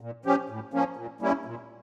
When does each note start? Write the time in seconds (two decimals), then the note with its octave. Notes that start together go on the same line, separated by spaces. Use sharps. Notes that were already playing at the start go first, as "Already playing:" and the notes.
0.01 A#2
0.25 F3 C#4 G4
0.50 A2
0.73 F3 A#3 C#4
0.97 A#2
1.21 G3 A#3 C#4 E4
1.45 A#2